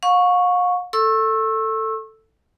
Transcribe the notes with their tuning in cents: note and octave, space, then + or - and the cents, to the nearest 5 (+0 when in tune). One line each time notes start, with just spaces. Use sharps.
F5 +40 C#6 +0
A4 +10 C#6 -35 E6 +0